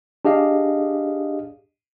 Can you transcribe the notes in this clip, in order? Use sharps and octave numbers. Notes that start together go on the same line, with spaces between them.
D4 G4 G#4 D#5 F5